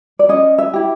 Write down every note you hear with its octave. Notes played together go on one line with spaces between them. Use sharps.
D5
C#4 D#5
E5
E4 G4